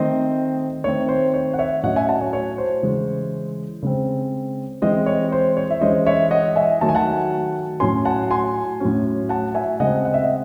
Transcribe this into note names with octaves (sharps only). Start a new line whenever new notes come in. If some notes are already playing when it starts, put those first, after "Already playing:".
Already playing: D#3 A3 C4 C5 D#5
D#3 A3 C4 C#5
C5
C#5
F#5
C#5 E5
A2 F#3 C#4 D#5 F#5
E5 G#5
F#5 A5
C#5
C#5
C5
C#3 E3 G#3
C#3 G#3 C4
E3 G#3 C4 C5 D#5
C#5
C5
C#5
E5
E3 G#3 C#4 C5 D#5
C#5 E5
D#5 F#5
E5 G#5
D#3 F#3 A3 A5
G#5
F#5 A5
A2 F#3 C#4 G#5 C6
F#5 A5
G#5 C6
A2 F#3 C#4
F#5 A5
E5 G#5
C#3 G#3 C4 D#5 F#5
F#5
E5
D#5